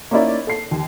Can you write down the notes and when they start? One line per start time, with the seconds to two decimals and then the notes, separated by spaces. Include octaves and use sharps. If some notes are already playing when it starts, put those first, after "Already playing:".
0.11 A#3 C#4 D#4 E4 D5
0.47 A4 C7
0.71 D#2